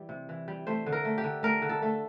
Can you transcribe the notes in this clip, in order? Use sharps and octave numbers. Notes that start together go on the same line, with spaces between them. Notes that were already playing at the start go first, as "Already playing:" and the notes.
Already playing: E3 G3
C3
E3
G3
A3 C5
D3
A#4
A3
G4
D3
A3 A#4
D3
A4
A3